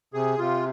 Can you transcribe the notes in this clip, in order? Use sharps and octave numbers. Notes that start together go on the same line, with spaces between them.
C3 G#4
C3 F4